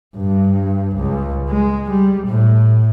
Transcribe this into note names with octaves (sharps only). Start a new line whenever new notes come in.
G2
C#2
G#3
G3
A2